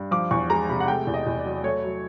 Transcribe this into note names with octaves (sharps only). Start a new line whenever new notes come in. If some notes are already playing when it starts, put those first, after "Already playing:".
Already playing: G2
F3 D6
E2 C#6
G#3 A#5
C3 B5
F#5
A3 G5
E2
D#5
E2
D5
F#3
A3 C#5
F#3